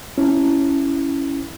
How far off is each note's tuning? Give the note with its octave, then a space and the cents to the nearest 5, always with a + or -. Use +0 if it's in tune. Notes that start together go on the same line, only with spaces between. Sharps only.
C#4 +0 E4 +0